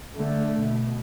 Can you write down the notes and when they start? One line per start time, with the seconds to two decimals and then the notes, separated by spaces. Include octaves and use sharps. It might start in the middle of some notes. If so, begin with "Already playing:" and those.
0.16 D3 A3
0.60 B2